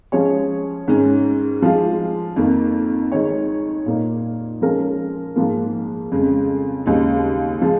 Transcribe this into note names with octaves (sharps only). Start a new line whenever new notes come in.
F3 G#3 C#4 G#4 C#5
G#2 D#3 C#4
F3 G#3 F4
F2 D#3 A#3 D#4
D#3 G#3 D#4 C#5
A#2 A#3 D#4
F3 G#3 C#4 A#4
G#2 F3 A#3
F2 C#3 G#3
D#2 C#3 G#3 D#4
F3 G#3